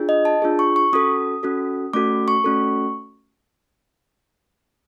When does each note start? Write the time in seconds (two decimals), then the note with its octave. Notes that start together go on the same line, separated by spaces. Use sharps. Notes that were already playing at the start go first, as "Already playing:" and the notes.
Already playing: D4 F4 G#4
0.09 D#5
0.25 A5
0.42 D4 F4 G#4
0.59 C#6
0.76 C#6
0.93 C#4 F#4 A4 D#6
1.43 C#4 F#4 A4
1.93 A3 C#4 F#4 A4 D6
2.28 C#6
2.44 A3 C#4 F#4 A4